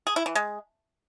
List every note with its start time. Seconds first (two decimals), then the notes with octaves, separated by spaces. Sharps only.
0.07 G#4
0.16 E4
0.26 E3
0.35 G#3